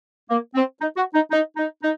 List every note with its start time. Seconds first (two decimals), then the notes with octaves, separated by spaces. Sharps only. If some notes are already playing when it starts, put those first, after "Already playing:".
0.29 A#3
0.54 C4
0.80 D#4
0.97 F#4
1.14 D#4
1.31 D#4
1.57 D#4
1.82 D#4